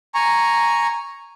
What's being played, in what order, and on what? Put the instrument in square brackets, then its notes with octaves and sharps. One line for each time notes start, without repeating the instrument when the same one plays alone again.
[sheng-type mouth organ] G#5 A#5 C#6